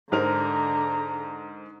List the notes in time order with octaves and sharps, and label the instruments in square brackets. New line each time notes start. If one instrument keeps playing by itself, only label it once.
[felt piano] G#2 A#4 C5 [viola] D3 A#5